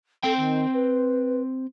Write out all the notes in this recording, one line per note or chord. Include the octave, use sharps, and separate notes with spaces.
C4 A4 G5
D#3
B4